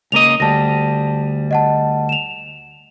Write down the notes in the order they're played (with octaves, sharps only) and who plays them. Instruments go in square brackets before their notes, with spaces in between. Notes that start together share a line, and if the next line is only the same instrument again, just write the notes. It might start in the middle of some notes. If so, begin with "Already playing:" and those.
[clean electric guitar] C#2 A#3 D#5 [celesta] D#7 F7
[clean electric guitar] D2 G3 [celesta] A5 A#6
[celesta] D#5 F#5 A5
E7 F7